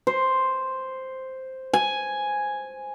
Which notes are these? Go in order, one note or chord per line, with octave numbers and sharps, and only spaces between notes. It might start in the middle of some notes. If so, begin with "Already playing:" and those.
C5
G#5